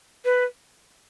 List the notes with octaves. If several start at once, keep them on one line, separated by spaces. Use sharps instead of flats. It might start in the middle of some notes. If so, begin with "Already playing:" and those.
B4